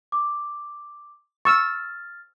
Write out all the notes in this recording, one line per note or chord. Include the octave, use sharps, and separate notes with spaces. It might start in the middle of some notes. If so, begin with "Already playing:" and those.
D6
C#6 E6 F6 A6